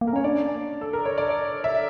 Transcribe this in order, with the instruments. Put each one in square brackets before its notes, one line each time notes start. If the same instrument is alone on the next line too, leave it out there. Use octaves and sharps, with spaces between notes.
[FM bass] A#3
[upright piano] A#4
[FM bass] C#4 [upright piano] C#5
[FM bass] D4 [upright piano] D5
[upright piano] A4
A#4
C#5
D5
E5